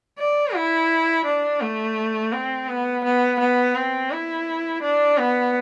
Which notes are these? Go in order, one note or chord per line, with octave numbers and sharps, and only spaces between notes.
D5
E4
D4
A3
C4
B3
B3
B3
C4
E4
D4
B3